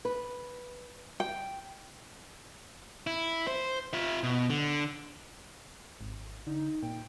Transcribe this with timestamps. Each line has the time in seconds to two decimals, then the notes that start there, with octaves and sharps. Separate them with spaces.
0.05 B4
1.20 G5
3.07 E4
3.47 C5
3.93 F4 E5
4.23 B2
4.50 D3
6.01 G#1
6.47 D3 D#4
6.83 A#2 G5